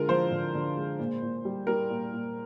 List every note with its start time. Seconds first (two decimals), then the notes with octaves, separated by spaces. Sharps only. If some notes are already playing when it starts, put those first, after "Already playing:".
Already playing: D3 G#3 F4 A#4
0.08 F3 C5
0.31 D3
0.55 D3
0.77 G#3
0.99 A#2
1.22 A#2
1.45 G3
1.67 G3 A#4
1.90 A#2
2.12 A#2